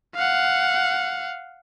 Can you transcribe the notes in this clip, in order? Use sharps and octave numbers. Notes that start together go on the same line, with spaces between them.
F5 F#5